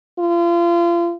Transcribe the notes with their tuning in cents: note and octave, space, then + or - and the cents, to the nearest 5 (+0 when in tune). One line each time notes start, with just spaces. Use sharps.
F4 -35